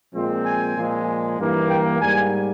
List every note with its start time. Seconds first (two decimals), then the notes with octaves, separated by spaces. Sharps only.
0.14 A#2 F3 G#3 C4
0.45 G#5
0.76 A#2 F3 G#3
1.38 G2 E3 A#3
1.69 G5
2.01 G#2 G3 A#3 G#5